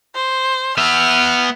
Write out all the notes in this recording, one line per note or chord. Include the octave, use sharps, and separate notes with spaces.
C5
B3 E5 F6